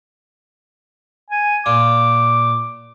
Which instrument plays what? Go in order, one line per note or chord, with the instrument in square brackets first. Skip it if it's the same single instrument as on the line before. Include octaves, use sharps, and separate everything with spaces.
[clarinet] G#5
[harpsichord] A#2 F4 [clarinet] D6